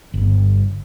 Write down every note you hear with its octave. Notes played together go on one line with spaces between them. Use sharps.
G1